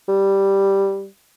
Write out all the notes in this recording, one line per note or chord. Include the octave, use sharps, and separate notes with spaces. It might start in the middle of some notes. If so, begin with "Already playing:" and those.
G3